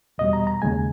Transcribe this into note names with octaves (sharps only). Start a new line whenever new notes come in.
E2 B2 G3 D#5
A#5
A#5
D#2 C#3 G#3 G#5